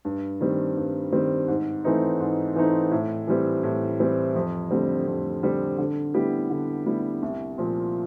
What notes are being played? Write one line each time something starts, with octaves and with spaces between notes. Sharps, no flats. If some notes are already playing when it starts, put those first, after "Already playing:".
G2
D#3 G3 C4
G2
D#3 G3 C4
G#2
E3 A3 C4 D#4
G#2
E3 A3 C4 D#4
A2
E3 G3 C4
A2
E3 G3 C4
F2
D3 G3 C4
F2
D3 G3 C4
D3
G3 B3 E4 G4
D3
G3 B3 E4 G4
C2
A#2 F3